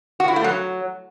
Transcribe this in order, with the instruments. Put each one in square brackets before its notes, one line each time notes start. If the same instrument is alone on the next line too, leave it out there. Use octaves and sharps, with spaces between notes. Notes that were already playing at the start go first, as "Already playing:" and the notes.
[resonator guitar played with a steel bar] F#4
E4
A3
F#3